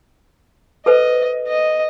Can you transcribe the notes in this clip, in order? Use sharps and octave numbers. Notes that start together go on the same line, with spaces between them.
A4 B4 C5 D#5
D#5